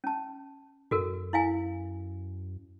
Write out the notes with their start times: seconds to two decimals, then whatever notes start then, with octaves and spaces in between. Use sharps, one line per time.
0.04 C#4 A5
0.91 F#2 F#4 A4 A#4
1.33 E4 F5 G#5